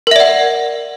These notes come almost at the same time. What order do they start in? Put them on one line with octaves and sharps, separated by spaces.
A#4 E5 D5 F#5